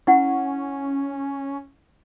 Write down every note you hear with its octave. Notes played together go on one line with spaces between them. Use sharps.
C#4 E4 F#5